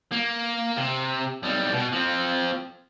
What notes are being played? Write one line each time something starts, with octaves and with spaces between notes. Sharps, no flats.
A#3
C3
B1 G3
B2
F3 C4